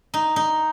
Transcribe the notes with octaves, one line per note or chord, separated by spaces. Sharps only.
D#4
D#4